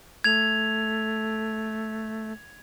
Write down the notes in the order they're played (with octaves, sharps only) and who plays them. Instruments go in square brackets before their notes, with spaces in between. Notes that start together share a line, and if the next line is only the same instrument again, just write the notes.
[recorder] A3 [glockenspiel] G#6 F7